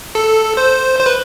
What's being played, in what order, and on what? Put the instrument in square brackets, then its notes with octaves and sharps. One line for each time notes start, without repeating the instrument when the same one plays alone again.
[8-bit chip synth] A4
C5
C5
B4